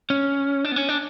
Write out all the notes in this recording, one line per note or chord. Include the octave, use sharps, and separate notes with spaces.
C#4
D4
B3
C#4
D4